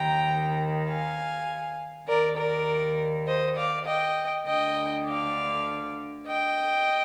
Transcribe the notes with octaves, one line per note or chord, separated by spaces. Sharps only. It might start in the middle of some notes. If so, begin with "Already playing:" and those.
Already playing: D#2 D#3 G5 A#5
F5 G#5
D#2 D#3 A#4 D5
A#4 D5
C5 D#5
D5 F5
D#5 G5
D2 D3 D#5 G5
D5 F5
D#5 G5